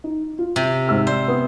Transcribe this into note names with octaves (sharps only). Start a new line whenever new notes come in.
D#4
F4
C3
G#2 E6 F6
C5 D5
B3 D#6